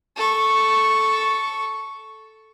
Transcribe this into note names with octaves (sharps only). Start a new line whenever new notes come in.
A4 C#6